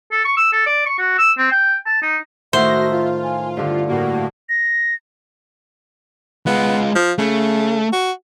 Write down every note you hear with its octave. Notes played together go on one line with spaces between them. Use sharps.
A4
C#6
E6
A4
D5
C#6
F#4
E6
C4
G5
A5
D#4
A2 D#3 A3 F#4 C5 E5 A#6
F4
G#5
G2 D3 F5
A2 A#3 F#4
A#6
G#3 B3 F4
F3
C#3 A3
F#4